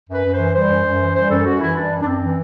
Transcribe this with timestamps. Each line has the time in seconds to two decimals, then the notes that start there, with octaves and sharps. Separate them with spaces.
0.08 F#2 B4
0.24 F#2
0.34 E3 C5
0.53 G3 C5
0.69 F#2
0.84 F#2
1.00 E3
1.15 G3 C5
1.30 F#2 A4
1.45 F#2 F#4
1.60 E3 E4
1.76 G3 D4
1.91 F#2
2.01 D4
2.06 F#2 C4
2.21 E3